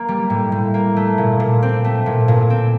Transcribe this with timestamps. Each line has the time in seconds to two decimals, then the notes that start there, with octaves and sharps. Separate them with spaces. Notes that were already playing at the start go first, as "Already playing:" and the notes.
Already playing: A#3
0.08 G3
0.30 A2
0.52 A2
0.74 A#3
0.96 A3
1.18 A#2
1.40 A#2
1.63 C4
1.84 A3
2.06 A#2
2.28 A#2
2.50 C4